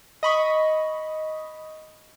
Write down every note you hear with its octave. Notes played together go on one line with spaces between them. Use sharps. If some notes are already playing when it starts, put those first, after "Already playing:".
D#5 B5 C#6